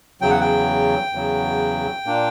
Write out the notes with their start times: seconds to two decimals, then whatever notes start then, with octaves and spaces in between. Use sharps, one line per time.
0.21 E2 C#3 F#3 G5
0.30 F#5
0.40 G5
1.13 E2 C#3 F#3
2.06 A#2 A#3 D4